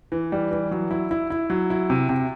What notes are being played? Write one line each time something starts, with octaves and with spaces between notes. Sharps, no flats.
E3
G3
E3
F#3
E4
E4
E4
F#3
E4
C3
C3